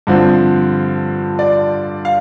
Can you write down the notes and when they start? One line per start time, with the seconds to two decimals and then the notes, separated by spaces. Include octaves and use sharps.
0.07 G2 D3 F3 C4
1.39 D5
2.05 F5